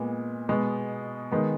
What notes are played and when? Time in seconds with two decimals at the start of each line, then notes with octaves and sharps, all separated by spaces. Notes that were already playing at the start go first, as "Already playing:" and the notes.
Already playing: A#2 G#3 B3
0.49 B2 G#3 B3
1.32 D#3 G#3 B3